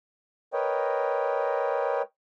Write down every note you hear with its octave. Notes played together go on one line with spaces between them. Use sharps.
A#4 B4 C#5 D#5 G5